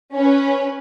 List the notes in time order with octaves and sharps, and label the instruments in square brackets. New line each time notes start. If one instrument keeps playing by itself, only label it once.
[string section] C#4 B4